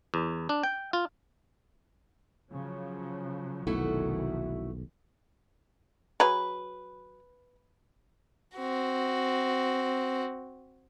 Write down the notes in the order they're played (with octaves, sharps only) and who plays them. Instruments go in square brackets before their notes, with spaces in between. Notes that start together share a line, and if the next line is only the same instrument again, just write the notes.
[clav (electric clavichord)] E2
D4
G5
F4
[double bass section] C#3 F3 F#3
[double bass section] F1 D#3 E3 [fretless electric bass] B1 [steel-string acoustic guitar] A3 E4 F#4
[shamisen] F#3 G#4 A#5 [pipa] B4
[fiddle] C4 F#4